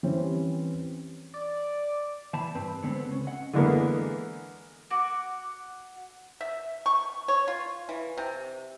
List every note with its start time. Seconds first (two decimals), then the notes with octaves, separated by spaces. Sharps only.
0.03 E3 G3 C4 C#4
1.34 D5
2.33 E3 A5 B5
2.55 G2 C4 B4 A5 B5
2.83 D3 G#3 B3 C4
3.08 C#2 C#4
3.27 D#5 F#5
3.53 D3 E3 G#3 A#3 B3
4.90 F#4 D6
6.41 E5
6.86 C#6
7.28 C#5
7.48 F4
7.89 E3
8.17 C3